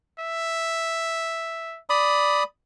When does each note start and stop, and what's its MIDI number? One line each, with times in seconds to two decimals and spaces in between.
0.20 1.80 76
1.90 2.43 74
1.90 2.43 83
1.90 2.43 87